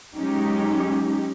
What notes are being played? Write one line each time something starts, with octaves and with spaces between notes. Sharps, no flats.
F#3 G#3 C#4 D#4 G4